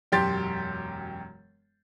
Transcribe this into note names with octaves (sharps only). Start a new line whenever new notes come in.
E1 F#2 G4 C6 A6